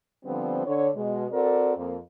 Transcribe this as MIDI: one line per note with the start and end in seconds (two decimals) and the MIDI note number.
0.25 0.63 50
0.25 0.63 53
0.25 0.63 55
0.25 0.63 59
0.25 0.63 60
0.65 0.89 50
0.65 0.89 73
0.95 1.27 47
0.95 1.27 56
1.32 1.72 60
1.32 1.72 66
1.32 1.72 69
1.32 1.72 70
1.32 1.72 74
1.76 1.96 41
1.76 1.96 58